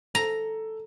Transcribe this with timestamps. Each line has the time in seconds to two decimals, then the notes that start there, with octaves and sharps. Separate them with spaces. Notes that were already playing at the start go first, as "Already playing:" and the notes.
0.15 A4 A#5